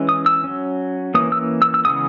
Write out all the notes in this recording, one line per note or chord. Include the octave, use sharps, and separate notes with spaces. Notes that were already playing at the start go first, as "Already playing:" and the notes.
Already playing: E3 G#3 C#4
D#6
E6
F#3 C#4
E3 A#3 C#4 D#6
E6
E6
E6
C#3 E3 G#3 B3 D#6